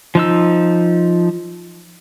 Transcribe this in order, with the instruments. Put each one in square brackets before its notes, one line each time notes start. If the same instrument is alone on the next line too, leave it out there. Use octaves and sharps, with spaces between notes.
[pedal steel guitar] F3 D#4 E6